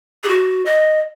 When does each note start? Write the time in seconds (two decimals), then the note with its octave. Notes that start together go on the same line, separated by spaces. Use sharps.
0.23 G#4
0.28 F#4
0.66 D#5